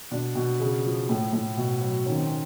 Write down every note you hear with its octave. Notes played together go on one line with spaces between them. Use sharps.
B2 D4
B2
C#3
F3
A2
A2
B2
F#3
D#3 C#4
C4
C#4